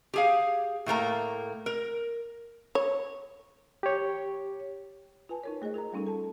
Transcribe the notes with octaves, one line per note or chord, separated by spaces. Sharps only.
G4 G#4 F5
A2 A3 A#3 A#5
A#4
C#5
G4 C#5
F4 B4 G#5 A5
D#4 A#4 C#5
A3 G#4 C5 D#5
F4 A#4 D#5 A#5
G3 A3 C#4 D#4 F4 A4
A4 A5